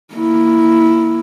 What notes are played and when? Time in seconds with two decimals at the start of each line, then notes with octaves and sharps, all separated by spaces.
0.14 A#3 E4